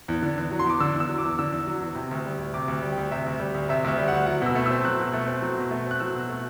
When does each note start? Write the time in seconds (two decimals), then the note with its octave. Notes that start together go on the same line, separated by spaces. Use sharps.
0.08 E2
0.22 D3
0.37 E2
0.51 F#3
0.59 C6
0.66 E2 D6
0.80 D3 E6
0.95 E2
1.00 E6
1.09 F#3
1.18 D6
1.24 E2
1.39 D3 E6
1.52 E2
1.67 F#3
1.81 E2
1.95 C3
2.11 D2
2.25 G3
2.39 D2
2.54 C3 D6
2.68 D2
2.82 G3
2.92 G5
2.97 D2
3.11 C3 E5
3.26 D2
3.40 G3
3.54 D2
3.69 C3 E5
3.84 D2 E5
3.98 G3
4.08 D2 F#5
4.26 F#3 F#5
4.42 B2 E6
4.55 A3
4.66 C4 E6
4.84 F#3 F#6
5.00 B2
5.13 A3
5.28 C4
5.42 F#3
5.58 B2
5.71 A3
5.86 C4 F#6
6.00 F#3 E6
6.15 B2
6.29 A3